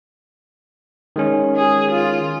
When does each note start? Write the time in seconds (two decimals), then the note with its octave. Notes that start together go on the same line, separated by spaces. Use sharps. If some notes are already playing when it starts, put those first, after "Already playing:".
1.16 D#3 G#3 C#4
1.56 G#4
1.92 F4